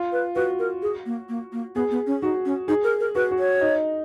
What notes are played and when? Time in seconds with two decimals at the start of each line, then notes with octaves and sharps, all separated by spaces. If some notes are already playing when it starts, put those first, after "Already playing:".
Already playing: F4
0.12 B4
0.35 F#4 B4
0.59 A#4
0.82 G#4
1.06 A#3
1.29 A#3
1.52 A#3
1.75 B3 G#4
1.91 B3
2.07 C#4
2.22 D#4 F#4
2.45 C#4
2.68 D#4 G#4
2.84 A#4
3.00 A#4
3.15 F#4 B4
3.31 F#4
3.39 C#5
3.61 D#4